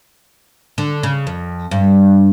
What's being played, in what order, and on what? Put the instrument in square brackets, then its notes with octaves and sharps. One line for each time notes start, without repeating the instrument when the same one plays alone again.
[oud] D3
C#3
F2
G2